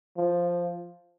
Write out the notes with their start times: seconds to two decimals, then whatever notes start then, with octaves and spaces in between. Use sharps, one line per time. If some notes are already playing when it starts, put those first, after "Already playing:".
0.17 F3